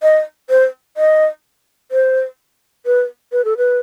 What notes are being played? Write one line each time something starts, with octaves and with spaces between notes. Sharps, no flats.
D#5
C5
D#5
C5
B4
B4
A4
B4